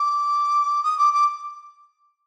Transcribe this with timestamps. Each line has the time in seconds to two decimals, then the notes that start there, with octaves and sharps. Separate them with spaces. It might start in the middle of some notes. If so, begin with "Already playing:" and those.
Already playing: D6
0.83 D#6
0.98 D6
1.13 D6